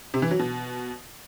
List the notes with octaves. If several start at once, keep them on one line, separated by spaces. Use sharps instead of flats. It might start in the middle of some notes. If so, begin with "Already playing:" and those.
C3
E3
F#3
B2